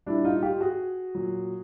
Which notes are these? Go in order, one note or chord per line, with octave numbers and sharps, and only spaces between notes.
A#2 G3 D4 E4
D#4 F4
F4 G4
F#4 G#4
A#2 F#3